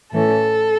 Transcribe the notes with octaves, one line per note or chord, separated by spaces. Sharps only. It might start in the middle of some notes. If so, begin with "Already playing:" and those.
A2 E3 A3 C#4 A4